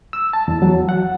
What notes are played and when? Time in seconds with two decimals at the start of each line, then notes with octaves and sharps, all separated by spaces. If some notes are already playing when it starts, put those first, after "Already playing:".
0.13 E6
0.33 A5
0.48 E2
0.62 F#3
0.89 F#5